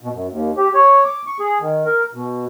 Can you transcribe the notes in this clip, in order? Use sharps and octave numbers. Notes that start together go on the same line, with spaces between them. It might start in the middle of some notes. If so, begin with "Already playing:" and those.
B2
F#2
D#2
G4
C#5
D6
C#6
G#4
D#3
A#4
B2